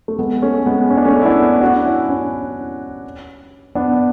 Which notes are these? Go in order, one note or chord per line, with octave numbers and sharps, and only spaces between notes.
A3
G#3 B3
A3 C#4
G#3 B3
C#4
D4
A3 C#4
E4
B3 D4
D4 F#4
C#4 E4
C#4 E4
B3 D4